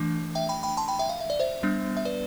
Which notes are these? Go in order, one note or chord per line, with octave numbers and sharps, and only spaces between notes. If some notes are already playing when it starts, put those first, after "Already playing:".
Already playing: E3 A3 D4
E5 G5
G5 B5
G5 B5
A5 C6
G5 B5
E5 G5
F5
E5
D5
C5 E5
G3 B3 D4
E5
B4 D5